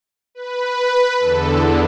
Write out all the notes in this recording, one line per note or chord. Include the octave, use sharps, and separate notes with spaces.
B4
E2 D3 A4